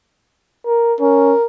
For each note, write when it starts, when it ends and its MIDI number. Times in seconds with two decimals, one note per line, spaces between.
0.67 0.95 70
1.00 1.34 61
1.00 1.46 70